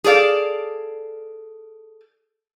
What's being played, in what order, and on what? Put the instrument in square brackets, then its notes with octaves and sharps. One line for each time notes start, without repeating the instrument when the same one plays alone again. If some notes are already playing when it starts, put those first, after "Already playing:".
[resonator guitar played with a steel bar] G#4 A4 D5 F5